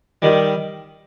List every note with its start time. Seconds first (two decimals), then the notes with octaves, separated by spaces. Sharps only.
0.22 D#3 G3